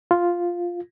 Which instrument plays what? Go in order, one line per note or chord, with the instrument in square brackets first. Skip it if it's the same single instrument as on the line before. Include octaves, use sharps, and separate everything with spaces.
[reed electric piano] F4